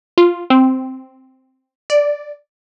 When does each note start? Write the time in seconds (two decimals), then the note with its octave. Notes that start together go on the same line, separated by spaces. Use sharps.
0.18 F4
0.50 C4
1.90 D5